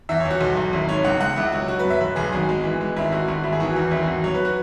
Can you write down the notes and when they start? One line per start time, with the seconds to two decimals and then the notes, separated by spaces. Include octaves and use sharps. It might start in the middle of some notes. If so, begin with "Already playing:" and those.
0.09 E2 E5
0.20 C#5
0.25 E2
0.30 F#4
0.40 B1
0.57 B1
0.73 G#1 E4
0.89 G#2 C#5
1.04 C#2 F#5
1.20 C#2 F#5
1.36 C#2 E4
1.52 F#3 F#4
1.68 F#3 F#4
1.79 B4
1.85 F#2
1.90 E5
2.01 B1 B4
2.16 B1 G#4
2.32 G#1 F#4
2.49 G#3
2.64 E3
2.81 G#3
2.96 G#1 E4
3.12 G#1 F#4
3.28 G#1 F#4
3.43 G#1 E4
3.53 G#4
3.60 E3 F#4
3.76 E2
3.91 G#1 E4
4.03 G#1 F#4
4.24 F#3 C#5
4.34 B4
4.45 F#4